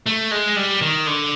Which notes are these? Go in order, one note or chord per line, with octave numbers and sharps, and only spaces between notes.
A3
G#3
G3
D#3
D3